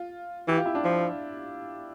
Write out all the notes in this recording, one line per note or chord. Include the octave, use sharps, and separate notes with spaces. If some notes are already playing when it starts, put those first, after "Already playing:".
Already playing: F4
E3 G4
F4
E4
D4
F3